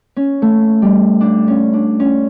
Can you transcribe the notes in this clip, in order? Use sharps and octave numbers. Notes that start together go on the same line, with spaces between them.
C#4
A3
G3
D4
C#4
D4
C#4